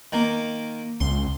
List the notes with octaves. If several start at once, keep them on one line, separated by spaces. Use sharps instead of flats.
D#3 A#3
C#2 C6